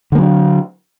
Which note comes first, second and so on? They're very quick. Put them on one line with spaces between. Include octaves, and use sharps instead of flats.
D3 A#3 F#3 D4